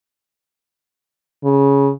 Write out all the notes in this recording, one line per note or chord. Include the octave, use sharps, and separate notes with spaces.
C#3